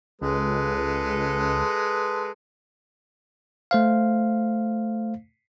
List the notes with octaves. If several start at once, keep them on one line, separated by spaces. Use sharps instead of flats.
C#2 G#3 A4 B4
A3 C5 F5